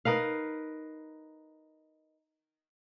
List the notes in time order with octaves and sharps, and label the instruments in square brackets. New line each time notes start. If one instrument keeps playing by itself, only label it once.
[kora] D#4 A#4 B4 F5